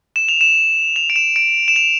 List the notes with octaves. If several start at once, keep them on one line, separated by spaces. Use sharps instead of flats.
E7
F7
E7
F7
D7
E7
D7
E7
F7